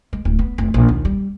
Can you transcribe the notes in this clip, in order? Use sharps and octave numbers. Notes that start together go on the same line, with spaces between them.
G#3
D1
B3
F1
A#1
D#2
G3